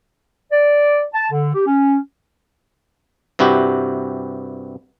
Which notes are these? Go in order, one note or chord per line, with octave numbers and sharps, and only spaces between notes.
D5
A5
D3
G4
C#4
G2 C3 E4 F#4 G4